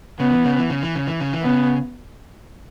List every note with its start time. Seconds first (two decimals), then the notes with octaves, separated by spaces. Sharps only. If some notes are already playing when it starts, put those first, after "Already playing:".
0.19 C#3 B3
0.32 E3
0.45 C#3
0.58 E3
0.70 C#3
0.83 E3
0.95 C#3
1.07 E3
1.20 C#3
1.33 E3
1.42 C#3 B3